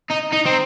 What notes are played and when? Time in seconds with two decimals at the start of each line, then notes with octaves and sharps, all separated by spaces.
0.11 D#4
0.33 D#4
0.46 C4